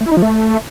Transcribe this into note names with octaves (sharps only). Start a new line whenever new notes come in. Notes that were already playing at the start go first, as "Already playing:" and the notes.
A3
E4
D#4
F3
A3